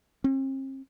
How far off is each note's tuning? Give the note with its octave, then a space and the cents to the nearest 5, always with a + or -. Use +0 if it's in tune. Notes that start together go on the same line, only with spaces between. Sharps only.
C4 +40